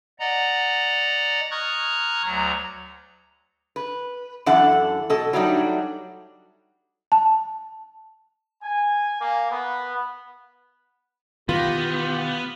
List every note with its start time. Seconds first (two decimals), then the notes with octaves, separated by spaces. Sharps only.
0.20 D5 D#5 F#5 A#5
1.51 A#5 C#6 D#6 F6 F#6 G#6
2.24 D2 F#3 A#5
3.76 B4
4.46 F#2 E3 D4 A4 F#5
5.10 B2 A4 D#5
5.33 F#3 G3 A3 D4 D#4
7.12 A5
8.63 G#5
9.21 A#3
9.51 B3
11.49 B2 D#3 E3 B3 F4 G4 A#6